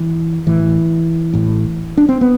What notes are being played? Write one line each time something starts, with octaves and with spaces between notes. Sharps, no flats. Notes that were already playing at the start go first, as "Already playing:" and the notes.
Already playing: E3
A1 A2 E3
A1 A2
D4
C4
B3